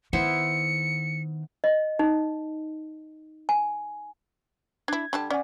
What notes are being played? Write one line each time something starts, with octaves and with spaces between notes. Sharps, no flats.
D#3 B3 E4 C5 C#7
D#5
D#4
G#5
D4 E4 G#6
D3 G3 A5
C#4 D5 F#5 G#5